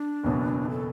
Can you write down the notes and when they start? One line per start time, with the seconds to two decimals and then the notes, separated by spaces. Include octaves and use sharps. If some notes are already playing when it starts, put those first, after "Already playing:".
Already playing: D4
0.24 F#1 E2 B2 F#3
0.70 A4